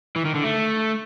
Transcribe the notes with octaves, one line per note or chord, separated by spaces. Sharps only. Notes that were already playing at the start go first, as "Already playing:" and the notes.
E3
D#3
D3
A3